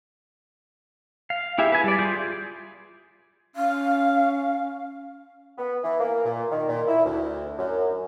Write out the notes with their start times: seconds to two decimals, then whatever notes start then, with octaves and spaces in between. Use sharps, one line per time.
1.30 F5
1.58 E4 G4 G#4 E5
1.72 B4 G#5
1.84 G3 D5
1.99 F4 G#4 G6
3.56 C#4 F5
5.58 B3
5.84 E3
5.99 A#3
6.25 A#2
6.51 D#3
6.68 A#2
6.87 E4
7.04 D2
7.57 F#2